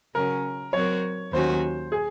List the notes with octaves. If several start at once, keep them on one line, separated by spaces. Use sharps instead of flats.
C#3 F#3 C#4 A#4
F#3 C4 F#4 A#4 C#5
D#2 D#3 F#3 C#4 F#4 C5
G#4